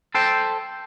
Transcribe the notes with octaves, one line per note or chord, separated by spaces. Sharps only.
A4 C5 G5